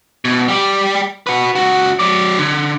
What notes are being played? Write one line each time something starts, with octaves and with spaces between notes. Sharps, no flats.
B2
G3 G4
F#4 B4
C#2 F#4
F#3 D5
D3